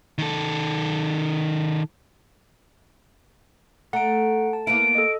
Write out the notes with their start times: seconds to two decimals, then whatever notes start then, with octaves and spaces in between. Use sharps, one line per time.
0.18 D#3 A4
3.93 A3 F#5 A#5 D7
4.53 A5
4.67 A#3 B3 E4 D7
4.95 A4 D#5